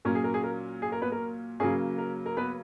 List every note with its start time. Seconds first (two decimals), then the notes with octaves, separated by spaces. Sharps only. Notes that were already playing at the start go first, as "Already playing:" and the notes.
0.05 A#2 F#3 C#4 A#4
0.15 G#4
0.24 A#4
0.34 G#4
0.44 A#4
0.82 G#4
0.92 A#4
1.02 B3 B4
1.12 A#4
1.60 C#3 F#3 A#3 C#4 G#4
1.98 A#4
2.26 A#4
2.37 B3 B4